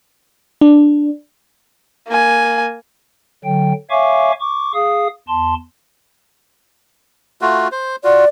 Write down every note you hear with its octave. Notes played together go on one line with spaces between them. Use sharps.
D4
A#3 G#5
D3 F#3 G5
C#5 E5 F5 G#5 C#6 D6
C#6 D6
G#4 F5 D#6
E2 A5 C6
A3 F4 F#4
C5
F4 F#4 D5